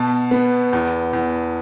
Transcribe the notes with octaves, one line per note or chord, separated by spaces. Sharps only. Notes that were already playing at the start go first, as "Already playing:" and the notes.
Already playing: B2 A5
B3
E2
E2